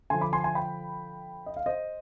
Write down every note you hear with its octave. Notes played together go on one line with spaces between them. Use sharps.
D3 F3 G#5 C6
B5 D6
G#5 C6
G#5 C6
G5 B5
D#5
F5
C5 D#5